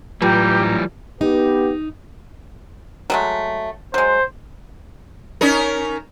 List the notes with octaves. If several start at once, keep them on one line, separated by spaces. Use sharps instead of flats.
A2 E3 F#3 G3 F4 G4 A#5
B3 D#4 G4
F#3 G#3 A3
F#3 G#3 C5
C#4 D#4 A#4